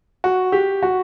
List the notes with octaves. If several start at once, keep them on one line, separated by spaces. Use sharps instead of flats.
F#4
G4
F#4